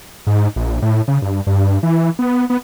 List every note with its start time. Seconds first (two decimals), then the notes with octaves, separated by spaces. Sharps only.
0.27 G#2
0.56 A#1
0.82 A2
1.08 C#3
1.22 G2
1.47 G2
1.83 E3
2.19 B3
2.50 B3